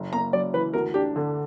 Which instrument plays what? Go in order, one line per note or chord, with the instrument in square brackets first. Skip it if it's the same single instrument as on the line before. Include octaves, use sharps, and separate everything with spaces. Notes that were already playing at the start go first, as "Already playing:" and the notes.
Already playing: [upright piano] F#1
[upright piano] A#3 [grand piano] A#5
[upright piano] F#2 [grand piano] D5
[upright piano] E3 [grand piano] B4
[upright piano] D2 [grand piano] A#4
[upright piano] D4 [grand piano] G4
[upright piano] D3